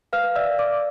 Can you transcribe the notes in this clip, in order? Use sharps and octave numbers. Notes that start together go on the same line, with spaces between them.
B4 F5 F6
D5 E5 E6
D5 D6